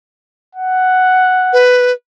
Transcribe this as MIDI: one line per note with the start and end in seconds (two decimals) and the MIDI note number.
0.55 1.62 78
1.53 1.92 71